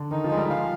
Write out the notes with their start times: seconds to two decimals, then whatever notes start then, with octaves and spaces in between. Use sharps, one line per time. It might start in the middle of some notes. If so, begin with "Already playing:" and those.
Already playing: D3
0.11 D#3 D#4
0.24 F3
0.30 G#3
0.37 G3
0.49 F3 F5